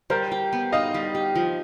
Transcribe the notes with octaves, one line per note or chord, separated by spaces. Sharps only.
G3 A#4 C5
G4
B3
D#4 D#5 F5
G3
G4
F3